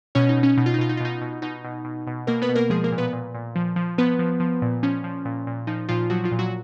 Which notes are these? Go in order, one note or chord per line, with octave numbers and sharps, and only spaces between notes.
B2 C#4 C#5
D#4
B2
C#4
B2 D#4
F4
D#4
B2 F4
D#4
F4
B2 D#4
B2
B2 D#4
B2
B2
B2
B2 A#3 A#4
B3 B4
B2
A#3 A#4
F3 G#3 G#4
A#3 A#4
A#2
B3 B4
A#2
A#2
F3
F3
F3 B3 B4
F3
F3
A#2
F3 C#4
F3
A#2
A#2
F3 D#4
A#2 F3 F4
F3 F#3 F#4
F3 F4
A#2
F#3 F#4